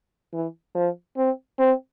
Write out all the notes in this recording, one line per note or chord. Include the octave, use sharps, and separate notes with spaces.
E3
F3
C4
C4